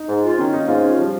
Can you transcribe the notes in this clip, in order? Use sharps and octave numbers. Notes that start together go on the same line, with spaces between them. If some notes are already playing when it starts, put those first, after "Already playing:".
Already playing: D#4
G#2
F4
D#3 C#4
A#3 D#4
G#2 F4
C#4 F4
F3 G3